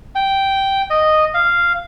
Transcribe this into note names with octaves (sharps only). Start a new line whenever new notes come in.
G5
D#5
F5